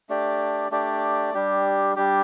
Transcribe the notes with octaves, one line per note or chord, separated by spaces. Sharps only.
A3 D4 G4 D5
A3 D4 G4 D5
G3 D4 G4
G3 D4 G4